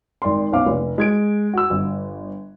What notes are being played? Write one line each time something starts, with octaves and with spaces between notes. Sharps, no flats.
G#1 D5 C6
B1 B3 C#4 F5 D6
F1
G#3 G#6 D7
F#4 E6
G1